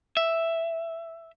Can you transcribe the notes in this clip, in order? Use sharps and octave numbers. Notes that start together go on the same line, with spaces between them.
E5